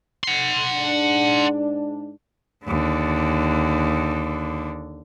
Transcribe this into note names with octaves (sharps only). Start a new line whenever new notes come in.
F#5 C6
G#2 D4
D#2 D3